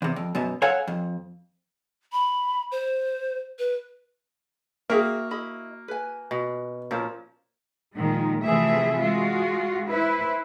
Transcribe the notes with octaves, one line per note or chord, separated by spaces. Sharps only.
E2 C3
F2
F#2 B2
A4 C#5 F5 F#5 G#5
F2
B5
C5
B4
A#3 F#4 G#4 E5 F5 G5
E4 D#5 B5
B4 G#5
B2
A#2 F3 C#4
A#2 D#3 F3 G#3
C3 E3 F3 A3 G#4 E5
G#3 F4 F#4
E4 B4 C5